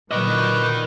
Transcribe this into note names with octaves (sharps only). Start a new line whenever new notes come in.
A#2 D3 F#3 A#4 B4 D#5 C#6 D6